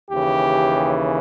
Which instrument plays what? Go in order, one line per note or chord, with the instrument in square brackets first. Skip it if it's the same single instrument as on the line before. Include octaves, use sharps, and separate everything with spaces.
[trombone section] D#2 C#3 E3 G4